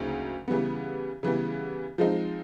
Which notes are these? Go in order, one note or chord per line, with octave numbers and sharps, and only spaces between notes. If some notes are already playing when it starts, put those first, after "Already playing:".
Already playing: D2 C#3 F#3 A#3 D#4
C#3 E3 G3 B3
C#3 E3 G3 B3
F3 G#3 C4 D#4